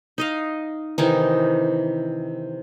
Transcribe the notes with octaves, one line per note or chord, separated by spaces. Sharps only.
D#4 D#5 F5
C3 D#3 E3 D#4